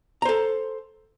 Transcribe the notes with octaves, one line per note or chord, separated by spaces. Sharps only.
A4 C5 A#5